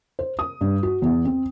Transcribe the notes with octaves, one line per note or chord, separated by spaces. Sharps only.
C5
D#6
G2
F#4
E2
C4